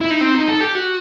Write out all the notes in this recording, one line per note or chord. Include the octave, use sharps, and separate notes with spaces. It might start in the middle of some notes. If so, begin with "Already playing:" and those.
E4
D#4
C4
D#4
A4
G4
F#4